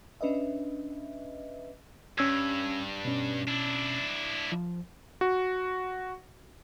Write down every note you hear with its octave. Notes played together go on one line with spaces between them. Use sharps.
C#4 D4 B4 D#5 E5
G2 C#4 E6 G#6
B2 C#4
D4 E4
F3
F#4